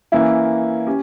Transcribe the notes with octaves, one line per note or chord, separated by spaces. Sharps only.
E3 A#3 C#4 E4
C#4 G4